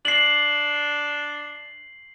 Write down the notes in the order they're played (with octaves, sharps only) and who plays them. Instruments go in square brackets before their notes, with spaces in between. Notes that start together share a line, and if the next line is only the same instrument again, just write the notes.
[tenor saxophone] D4 [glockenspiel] C7 F#7